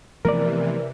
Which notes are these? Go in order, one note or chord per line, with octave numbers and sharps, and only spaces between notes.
C3 E3 F3 A3 B3 A#4 D5